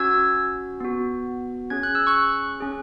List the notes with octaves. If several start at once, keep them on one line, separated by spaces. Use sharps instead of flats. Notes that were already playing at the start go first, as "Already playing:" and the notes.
Already playing: C#4 F#4 E6 G#6
B3 F#4
C#4 G#4 G#6
F#6
E6
C#6 F#6
C#4 G#4